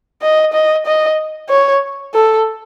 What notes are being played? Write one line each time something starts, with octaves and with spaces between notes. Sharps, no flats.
D#5
D#5
D#5
C#5
A4